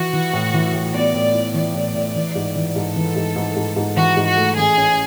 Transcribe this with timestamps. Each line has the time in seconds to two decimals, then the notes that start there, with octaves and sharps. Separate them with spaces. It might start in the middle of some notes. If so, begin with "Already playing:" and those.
Already playing: E3 E4 F#4
0.13 E3
0.33 A2
0.54 E3
0.74 A2
0.94 B3 D5
1.14 A2
1.34 E4
1.54 E3 D5
1.75 A2
1.95 A2
2.15 E3
2.35 G#2
2.55 E3
2.75 G#2 A4
2.96 E3
3.16 G#2
3.36 G#2
3.56 G#2
3.76 G#2
3.97 E3 F#4
4.17 G#2
4.28 F#4
4.37 A3
4.57 A1 G#4
4.77 C#4